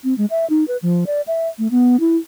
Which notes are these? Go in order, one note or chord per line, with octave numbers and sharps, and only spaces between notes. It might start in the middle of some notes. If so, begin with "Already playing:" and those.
C4
G#3
E5
D#4
B4
F3
D5
E5
A3
B3
E4